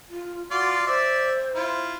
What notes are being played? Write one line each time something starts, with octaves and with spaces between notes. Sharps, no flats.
F4
F4 F#4 D5 C6
C5 D5 E5
E4 F4